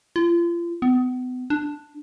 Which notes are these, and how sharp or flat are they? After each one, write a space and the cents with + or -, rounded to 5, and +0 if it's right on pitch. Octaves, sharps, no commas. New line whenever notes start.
F4 -35
B3 +35
D4 +5